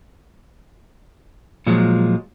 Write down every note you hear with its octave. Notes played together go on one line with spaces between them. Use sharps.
A#2 F3 F#3 G#3